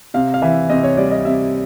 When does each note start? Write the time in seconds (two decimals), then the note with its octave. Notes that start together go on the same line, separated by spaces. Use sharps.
0.14 C3 F5
0.34 F5
0.42 E3 E5
0.70 C3 D#5
0.84 C#5
0.97 G3 D5
1.11 D#5
1.25 C3 E5